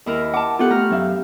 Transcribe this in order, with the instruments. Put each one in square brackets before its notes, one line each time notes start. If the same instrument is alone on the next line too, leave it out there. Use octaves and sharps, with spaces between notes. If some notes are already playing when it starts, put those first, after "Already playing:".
[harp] D#2 E4 A#4
[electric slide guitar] F#5 A5 [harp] D6
[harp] B3 G4 F#5 [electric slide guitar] F4 A4
[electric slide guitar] A3 [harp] A#5 F6
[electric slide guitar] F#2 E5 F5